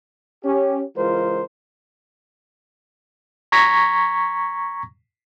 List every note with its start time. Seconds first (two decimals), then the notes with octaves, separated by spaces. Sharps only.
0.44 C#4 G4
0.97 C#2 E3 G#3 F4 A#4 C5
3.52 A#5 C#6 G#6 A#6 B6